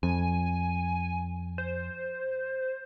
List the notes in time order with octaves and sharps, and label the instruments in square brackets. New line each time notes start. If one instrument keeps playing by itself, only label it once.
[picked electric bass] F2 [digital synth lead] G#5
[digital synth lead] C5